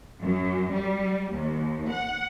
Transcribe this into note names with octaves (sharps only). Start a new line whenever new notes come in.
F#2
G3
D#2
F#5